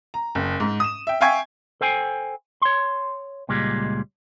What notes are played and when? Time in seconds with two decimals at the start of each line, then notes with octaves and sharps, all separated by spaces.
0.14 A#5
0.35 F#1
0.60 G#2
0.80 D#6 E7
1.07 E5 G5
1.21 E5 F5 G5 G#5 C#6 G#6
1.81 A4 C5 G5 G#5
2.62 C#5 C6
3.49 C#2 A#2 G3 G#3